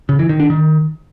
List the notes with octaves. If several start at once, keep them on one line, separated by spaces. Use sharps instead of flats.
C#3
E3
D#3
D4
D#3